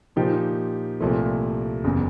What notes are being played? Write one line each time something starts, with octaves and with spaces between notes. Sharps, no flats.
A#2 F3 A#3 D#4 G4
C2 A#2 F3 A3
F#1 E2 C#3